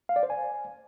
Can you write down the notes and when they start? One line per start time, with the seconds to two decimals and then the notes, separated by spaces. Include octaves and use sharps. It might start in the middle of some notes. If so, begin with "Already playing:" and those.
0.09 F5
0.16 D5
0.23 C5
0.30 G#5